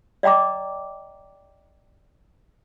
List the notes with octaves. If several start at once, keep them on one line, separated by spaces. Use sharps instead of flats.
D5 D#5 G5 A#5 D6